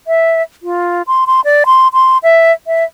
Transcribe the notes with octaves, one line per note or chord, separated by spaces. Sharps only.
E5
F4
C6
C6
D5
C6
C6
E5
E5